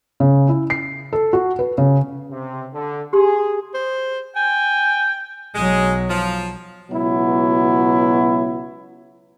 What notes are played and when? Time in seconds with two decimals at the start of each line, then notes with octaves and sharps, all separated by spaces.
0.20 C#3
0.49 E4
0.70 C7
1.13 A4
1.33 F#4
1.59 B4
1.78 C#3
2.31 C3
2.73 D3
3.13 G4 G#4 C6
3.74 C5
4.36 G5 G#5
5.55 B1 F#3 G#3
6.10 F3
6.91 C#2 B2 F#3 B3 E4